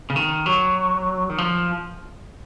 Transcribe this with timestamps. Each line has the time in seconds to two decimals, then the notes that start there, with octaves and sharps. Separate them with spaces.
0.10 C#3
0.16 D#3
0.46 F#3
1.30 D#3
1.38 F3